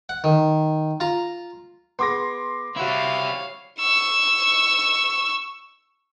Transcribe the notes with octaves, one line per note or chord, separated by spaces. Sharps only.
F#5
D#3
F4 A#5
B3 G#4 C6 D6 A#6
G3 E4 F#4 C#5 E5 F5
C#6 E6